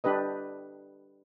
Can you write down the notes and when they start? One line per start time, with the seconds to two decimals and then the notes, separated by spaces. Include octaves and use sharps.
0.04 D4 G4 B4 D#5